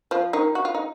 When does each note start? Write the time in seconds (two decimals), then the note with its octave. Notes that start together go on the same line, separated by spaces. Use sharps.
0.11 F3 F4
0.33 D#3 D#4
0.55 F#4
0.65 F4
0.75 D#4